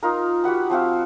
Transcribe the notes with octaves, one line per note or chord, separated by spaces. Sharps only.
D#4 F4 A#4
F#4 G4 F#5 B5
F3 C4 F#4 F5